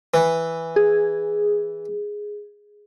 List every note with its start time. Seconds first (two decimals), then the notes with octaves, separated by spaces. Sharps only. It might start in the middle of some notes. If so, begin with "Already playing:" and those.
0.14 E3
0.76 G#4